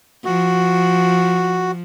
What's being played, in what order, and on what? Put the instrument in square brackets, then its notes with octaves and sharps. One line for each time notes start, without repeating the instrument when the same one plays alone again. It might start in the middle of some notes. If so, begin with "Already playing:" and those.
[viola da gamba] F3 [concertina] F#4